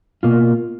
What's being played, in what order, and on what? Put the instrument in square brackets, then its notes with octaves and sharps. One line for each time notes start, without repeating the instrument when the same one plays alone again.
[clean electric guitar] B2 A#3 F4